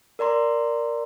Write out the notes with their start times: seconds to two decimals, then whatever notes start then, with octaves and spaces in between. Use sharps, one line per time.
0.19 A#4 D5 A#5 C6